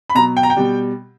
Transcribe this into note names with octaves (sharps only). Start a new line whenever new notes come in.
B5
B2 F#3 A#5
G5
A#5
G5
B2 G3